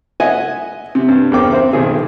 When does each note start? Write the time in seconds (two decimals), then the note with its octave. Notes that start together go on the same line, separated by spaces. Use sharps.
0.20 D#5 E5 F#5 G#5
0.95 C3
1.08 G2
1.32 E2 C#3 A#4 C5 G5 D6
1.52 C4 C5 E5
1.73 B1 D#3 G#4